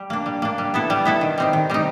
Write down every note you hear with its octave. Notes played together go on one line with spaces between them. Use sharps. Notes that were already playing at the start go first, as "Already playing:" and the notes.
Already playing: G3
A#3 D4
G3
A#3 D4
G3
B3 E4 A4
G3
B3 E4 A4
D#3
G3 C4 D#4
D#3
G3 C4 D#4